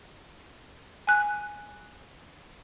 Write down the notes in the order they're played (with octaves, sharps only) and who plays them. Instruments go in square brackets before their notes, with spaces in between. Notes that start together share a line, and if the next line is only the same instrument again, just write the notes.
[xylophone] G#5 F#6